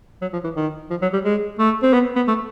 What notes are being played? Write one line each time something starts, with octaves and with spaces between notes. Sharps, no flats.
F#3
F3
E3
D#3
F3
F#3
G3
G#3
A3
C4
B3
B3
A3